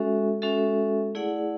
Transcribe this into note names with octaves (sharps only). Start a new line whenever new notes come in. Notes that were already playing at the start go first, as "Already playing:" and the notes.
Already playing: G#3 C#4 F#4 A4 E5
G#3 C#4 F#4 A4 E5
A3 E4 G#4 D5 F#5